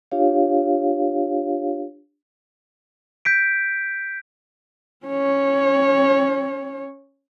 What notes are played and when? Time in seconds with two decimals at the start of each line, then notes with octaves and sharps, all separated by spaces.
0.11 D4 F4 G4 C#5 F5
3.25 G6 B6 D7
5.06 C#4 C#5